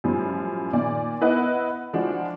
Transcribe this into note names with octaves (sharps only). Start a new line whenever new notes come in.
F#2 A2 F3 G3
A#2 D#3 D5 G#5
B3 E4 B4 D#5 F#5
F3 G#3 D4 E4 F#4